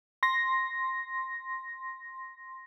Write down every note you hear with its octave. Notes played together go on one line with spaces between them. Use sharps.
C6 A#6